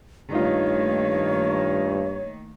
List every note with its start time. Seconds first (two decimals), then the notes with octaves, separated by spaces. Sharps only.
0.32 G2 D#3 A3 A#3 D#4 F4 C#5